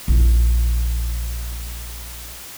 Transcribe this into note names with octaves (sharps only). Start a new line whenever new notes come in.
A#1 E4